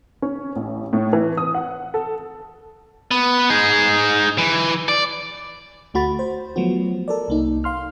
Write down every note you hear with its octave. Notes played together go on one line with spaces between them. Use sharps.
C#4
A1
A2
E3
D#6
F#5
A4
B3
D#4 G#4
E3
D5
D2 A3 F#4 B5 A6
C5
F3 F#3 A3 B3 F#4
A4 A#4 D5
C2 A#3 D#4
F5 C6 F6